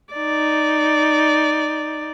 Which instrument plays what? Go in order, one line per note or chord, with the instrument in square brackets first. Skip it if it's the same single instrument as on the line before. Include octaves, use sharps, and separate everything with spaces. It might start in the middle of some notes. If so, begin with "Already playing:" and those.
[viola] D#4 D5